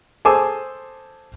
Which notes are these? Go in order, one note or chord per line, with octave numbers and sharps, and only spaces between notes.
G#4 A4 C5 G#5 D6 E6